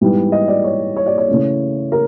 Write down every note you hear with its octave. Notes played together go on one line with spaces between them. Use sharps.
G#2 E3 G3 B3
D#5
D5
C#5
C#5
D5
C#5
C#3 E3 A3 C#4
A#4